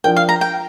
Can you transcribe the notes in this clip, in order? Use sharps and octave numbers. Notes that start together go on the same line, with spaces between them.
F3 D4 A#4 G5
F5
A#5
G5